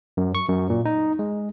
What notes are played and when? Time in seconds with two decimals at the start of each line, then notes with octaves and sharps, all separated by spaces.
0.17 F#2
0.35 C#6
0.49 F#2
0.70 A#2
0.85 D#4
1.19 G#3